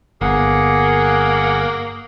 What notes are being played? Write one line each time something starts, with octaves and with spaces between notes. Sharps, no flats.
G1 A#3 G#4 F#5